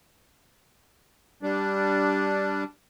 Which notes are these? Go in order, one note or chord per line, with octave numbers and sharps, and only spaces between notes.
G3 D4